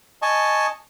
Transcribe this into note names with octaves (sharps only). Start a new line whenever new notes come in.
D#5 G#5 A5 C#6